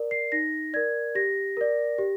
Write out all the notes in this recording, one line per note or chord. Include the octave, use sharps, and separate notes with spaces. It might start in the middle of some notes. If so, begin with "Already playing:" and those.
Already playing: A#4 D5
C7
D#4 A#6
A#4 D5 G#6
G4 A#6
A#4 D5
G4